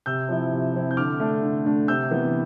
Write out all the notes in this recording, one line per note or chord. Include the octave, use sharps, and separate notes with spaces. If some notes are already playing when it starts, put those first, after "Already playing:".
C3 E6 G6
F3 C4 E4
C3
F3 C4 E4
G6
D3 D6 F6
A3 D4
D3
A3 D4
C3 E6 G6
E3 B3